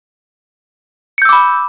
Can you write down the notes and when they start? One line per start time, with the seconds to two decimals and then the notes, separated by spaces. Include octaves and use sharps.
1.18 C#7
1.22 G6
1.25 E6
1.29 D6
1.33 B5